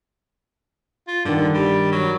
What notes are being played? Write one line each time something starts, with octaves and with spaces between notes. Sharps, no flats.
F4
G2 D3 D#3
G3
F#3